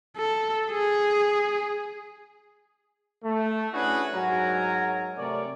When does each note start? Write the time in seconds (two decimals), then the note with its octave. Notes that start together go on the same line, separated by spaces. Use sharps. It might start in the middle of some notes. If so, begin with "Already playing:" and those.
0.17 A4
0.71 G#4
3.24 A3
3.73 C#4 D4 E4 F#4 G#4 B4
4.15 G#2 F#3 F#4 A#4 G#5 A#5
5.18 C3 A3 A#4 C#5 D5